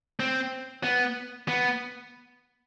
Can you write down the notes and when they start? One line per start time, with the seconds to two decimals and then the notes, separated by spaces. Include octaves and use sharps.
0.20 C4
0.83 B3
1.48 B3